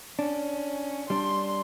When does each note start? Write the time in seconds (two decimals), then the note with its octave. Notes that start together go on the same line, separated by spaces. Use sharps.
0.19 C#4 D4
1.10 G3 D4 C6